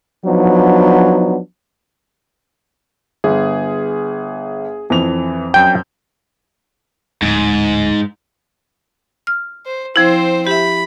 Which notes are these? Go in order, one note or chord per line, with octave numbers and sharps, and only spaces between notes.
F3 F#3 B3 D4 D#4
G1 G#4
F2 E3 F7
F#2 G5 G6
D1 G#2
F6
C5
F3 C4 E4 C5
G4 E5 B5